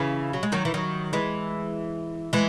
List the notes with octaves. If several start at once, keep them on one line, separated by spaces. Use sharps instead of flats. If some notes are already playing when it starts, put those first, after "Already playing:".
Already playing: C#3 E3
F#3
G#3
D#3 F#3
E3
D#3 F#3
E3 G#3
E3 G#3